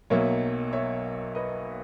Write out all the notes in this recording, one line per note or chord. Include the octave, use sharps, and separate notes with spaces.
B1 B2 F#3 A#3 C#5 E5
C#5 E5
B4 D#5